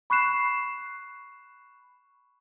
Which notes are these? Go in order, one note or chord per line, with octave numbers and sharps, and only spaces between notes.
B5 C#6 F#6 C7 E7